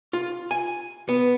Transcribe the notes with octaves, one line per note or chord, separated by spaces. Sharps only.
F4
G#5
B3